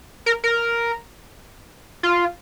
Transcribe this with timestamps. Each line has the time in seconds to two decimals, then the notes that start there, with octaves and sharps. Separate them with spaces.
0.26 A#4
0.44 A#4
2.03 F4